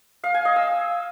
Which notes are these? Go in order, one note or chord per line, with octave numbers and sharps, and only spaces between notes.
F5
G#5
D#5
E6